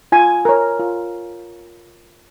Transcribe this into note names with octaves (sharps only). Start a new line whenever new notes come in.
F4 G#5
A#4 C#5
F4